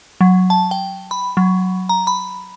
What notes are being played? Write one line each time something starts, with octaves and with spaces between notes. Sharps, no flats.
F#3
A5
G5
B5
F#3
A#5
B5